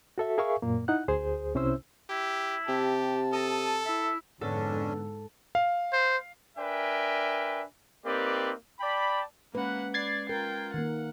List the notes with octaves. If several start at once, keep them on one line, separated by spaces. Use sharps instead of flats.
F#4 A4 E5
G#4 A#4 E5 F5 G#5 C#6
F#2 A#2 A#3
D#4 E4 F#5 F#6
D2 G#4 C5
C2 C3 C#4 E4 C5 E6
E4 G4
C3 G4 A5
A4 D#6
E4 E5
F2 G#2 D3 B3 C#4 D4 A4
F5
C5
D4 A#4 B4 E5 G5 G#5
A#3 C4 D#4 G4 B4 D5
D5 G5 A5 B5
G#3 A#3 C#4 B4 F#5
D5 G#6 A6 C7
F4 A#4 G5
D#3 A#3 F#5